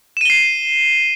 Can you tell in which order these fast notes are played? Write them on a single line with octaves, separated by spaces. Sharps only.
E7 D#7 G7 C7